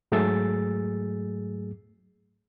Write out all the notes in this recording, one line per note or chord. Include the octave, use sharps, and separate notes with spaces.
G#2 F#3 A3 G#4 E6 A6